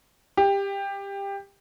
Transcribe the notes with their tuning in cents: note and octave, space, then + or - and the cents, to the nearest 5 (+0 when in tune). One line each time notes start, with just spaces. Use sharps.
G4 +15